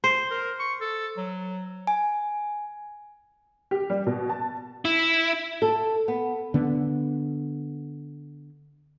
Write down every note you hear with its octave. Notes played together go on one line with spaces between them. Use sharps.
C5
A#4
C#6
A4
F#3
G#5
G4
G3
B2
A5
E4
A4
B3
D3 B3